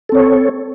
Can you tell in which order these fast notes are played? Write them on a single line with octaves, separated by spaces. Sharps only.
A4 C4 C#5